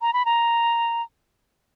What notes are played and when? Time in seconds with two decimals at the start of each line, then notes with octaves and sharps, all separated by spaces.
0.02 A#5
0.13 B5
0.25 A#5